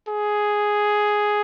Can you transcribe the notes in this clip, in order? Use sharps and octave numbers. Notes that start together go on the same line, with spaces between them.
G#4